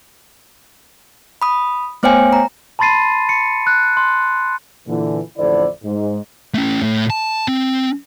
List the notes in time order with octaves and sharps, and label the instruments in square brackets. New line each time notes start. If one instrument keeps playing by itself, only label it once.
[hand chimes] B5 D#6
A3 B3 C5 C#5 G5 G#5
A#5
[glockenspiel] A5 B5 C6 A6 C7 D#7
C#7
F#6
C6
[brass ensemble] A#2 D3 E3
A1 F2 D3 E4 C5 D5
G#2
[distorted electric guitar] A3 C#4
A2
A5
C4